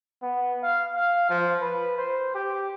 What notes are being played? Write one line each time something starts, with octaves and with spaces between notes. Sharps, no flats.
B3
F5
F5
F3
B4
C5
G4